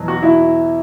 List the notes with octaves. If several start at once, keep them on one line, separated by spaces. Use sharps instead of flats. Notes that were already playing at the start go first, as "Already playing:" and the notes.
Already playing: E2 B2 F#3
F#4
E4